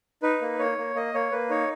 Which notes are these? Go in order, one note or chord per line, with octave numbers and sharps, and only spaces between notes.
D#4 B4
A#3
A#3 C#5
A#3
A#3 D#5
A#3 C#5
A#3 B4
D#4 C#5